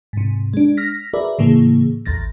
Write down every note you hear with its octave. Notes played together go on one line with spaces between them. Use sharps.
G#2 C3
G#3 D4
F6 A#6 B6
F#4 G#4 A#4 B4 D5 E5
A2 C#3 E3 A#3 G#4
A1 E2 A6 A#6